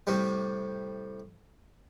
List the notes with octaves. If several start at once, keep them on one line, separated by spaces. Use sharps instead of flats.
A2 C3 G3